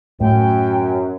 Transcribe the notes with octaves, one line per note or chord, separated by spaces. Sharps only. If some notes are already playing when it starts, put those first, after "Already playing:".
F#2 A2 G5